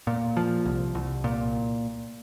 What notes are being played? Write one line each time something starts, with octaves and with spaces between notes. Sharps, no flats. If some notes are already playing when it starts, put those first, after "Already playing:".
A#2
F3
C2
C2
A#2